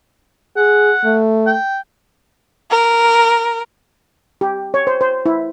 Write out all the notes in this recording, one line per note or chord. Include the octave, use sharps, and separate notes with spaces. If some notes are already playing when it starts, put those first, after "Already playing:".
G#4 F#5
A3
G5
A#4
G4
C#5
C5
C5
E4